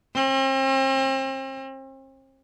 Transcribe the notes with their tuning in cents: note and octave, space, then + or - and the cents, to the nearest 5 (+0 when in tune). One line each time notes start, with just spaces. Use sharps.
C4 +40